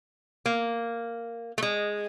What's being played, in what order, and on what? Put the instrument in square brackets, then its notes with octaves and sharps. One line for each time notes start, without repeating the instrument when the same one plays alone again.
[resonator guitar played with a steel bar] A#3
A3
G#3